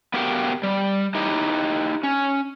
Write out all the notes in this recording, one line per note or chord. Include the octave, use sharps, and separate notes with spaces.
B3 F#4 G4 A#4 F5 G5
G3
D#4 E4 G4 D#5
C#4